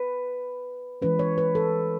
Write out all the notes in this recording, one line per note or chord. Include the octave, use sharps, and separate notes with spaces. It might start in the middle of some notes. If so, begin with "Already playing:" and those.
Already playing: B4
E3 G#3 C#4 B4
C#5
B4
A4